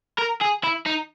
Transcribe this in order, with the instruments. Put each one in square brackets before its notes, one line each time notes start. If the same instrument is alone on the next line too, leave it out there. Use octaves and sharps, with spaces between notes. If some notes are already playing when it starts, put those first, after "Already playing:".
[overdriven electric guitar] A#4
G#4
E4
D#4